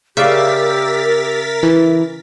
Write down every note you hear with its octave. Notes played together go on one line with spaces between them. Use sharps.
C#3 G4 A#4 D5 E5 F5 A6 B6
E3